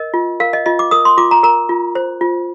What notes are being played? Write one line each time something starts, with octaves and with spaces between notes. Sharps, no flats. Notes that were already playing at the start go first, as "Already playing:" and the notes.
Already playing: A#4 D#5
F4
A#4 F5
D#5
F4 D#5
D6
A#4 D#6
C6
F4 D6
A#5
A#4 A#5
F4
C5
F4